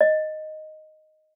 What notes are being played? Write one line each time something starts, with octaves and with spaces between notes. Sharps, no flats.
D#5